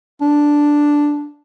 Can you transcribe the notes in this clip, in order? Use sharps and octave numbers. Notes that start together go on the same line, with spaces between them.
D4